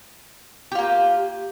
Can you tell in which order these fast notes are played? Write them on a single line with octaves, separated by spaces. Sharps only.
G4 F4 A#3